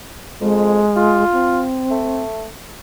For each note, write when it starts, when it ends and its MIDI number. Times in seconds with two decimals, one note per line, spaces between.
0.41 0.83 41
0.41 1.24 56
0.96 1.62 65
1.33 2.24 60
1.91 2.47 57